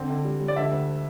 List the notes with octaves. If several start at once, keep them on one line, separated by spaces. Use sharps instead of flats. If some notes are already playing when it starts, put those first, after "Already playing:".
Already playing: D3 C4
D3
G3
G3
D5
D3 E5
D2